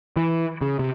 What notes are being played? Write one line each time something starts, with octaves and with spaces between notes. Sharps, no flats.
E3
C#3
C3